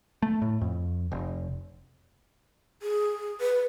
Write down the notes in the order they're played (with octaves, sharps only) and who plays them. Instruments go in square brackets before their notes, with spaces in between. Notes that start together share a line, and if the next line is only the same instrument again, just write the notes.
[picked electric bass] A3
A2
F2
F1
[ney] G#4
B4